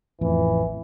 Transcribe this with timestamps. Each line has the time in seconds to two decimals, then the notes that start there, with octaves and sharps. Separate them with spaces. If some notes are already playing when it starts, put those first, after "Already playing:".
0.21 A1 F2 E3